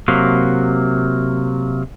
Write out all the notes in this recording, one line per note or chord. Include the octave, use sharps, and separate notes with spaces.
C3 F#3 A#3